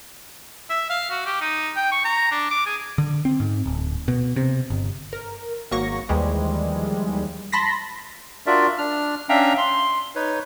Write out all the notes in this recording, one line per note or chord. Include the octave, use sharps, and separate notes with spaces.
E5
F5
F#4
G4
D#4
G5
C#6
A#5
D4
D6
G#4
D3
C4
G#2
D1
B2
C3
G1
A#4
G#1 F#3 A#3 C#6 A#6
D#2 E3 F3 G3 G#3
A5 B5 C6 A#6 B6
D4 F4 F#4 A#4 D5 E5
D4 F6
C#4 D4 E5 F5 G5 A#5
C6
D#4 B4 C#5